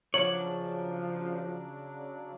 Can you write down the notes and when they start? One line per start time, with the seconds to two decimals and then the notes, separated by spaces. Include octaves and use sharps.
0.14 C#3 F3 F#3 D4 C#5 F#7